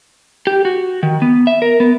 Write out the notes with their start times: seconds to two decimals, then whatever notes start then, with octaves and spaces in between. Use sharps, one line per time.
0.47 G4
0.65 F#4
1.03 D#3
1.22 B3
1.47 E5
1.62 A#4
1.80 B3